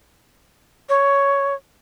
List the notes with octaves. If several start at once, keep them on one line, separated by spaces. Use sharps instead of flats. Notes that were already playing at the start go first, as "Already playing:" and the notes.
C#5